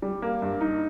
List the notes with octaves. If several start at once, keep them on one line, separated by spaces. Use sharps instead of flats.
G3
A#3
G2
D#4